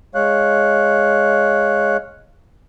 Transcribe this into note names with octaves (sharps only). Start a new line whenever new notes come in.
G#3 C#5 F5 F#6